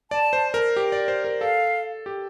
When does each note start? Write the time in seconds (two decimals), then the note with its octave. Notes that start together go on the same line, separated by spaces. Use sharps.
0.11 D5 A5
0.33 C5
0.54 A#4
0.77 G4
0.92 D5
1.08 C5
1.25 A#4
1.41 A4 F5
2.06 G4